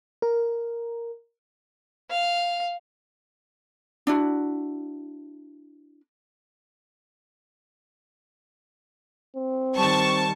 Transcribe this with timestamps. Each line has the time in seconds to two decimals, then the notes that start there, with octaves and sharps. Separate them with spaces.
0.22 A#4
2.11 F5
4.07 D4 E4 F#4
9.36 C4
9.77 D#3 G3 A5 C#6